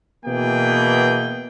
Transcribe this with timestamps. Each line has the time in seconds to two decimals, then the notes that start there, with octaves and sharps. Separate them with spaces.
0.25 B2 E3 A#3 G#4 G5